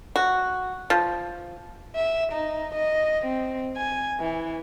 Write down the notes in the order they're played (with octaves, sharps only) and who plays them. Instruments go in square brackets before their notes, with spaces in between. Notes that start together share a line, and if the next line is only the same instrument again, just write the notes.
[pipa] F#4
F3
[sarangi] E5
D#4
D#5
C4
G#5
E3